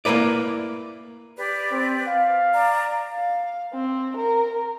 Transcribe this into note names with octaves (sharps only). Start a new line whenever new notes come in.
A#3 E4 A#4 B4 D5
G4 B4 D5
C4
F5
D5 A#5
F5
C4
A#4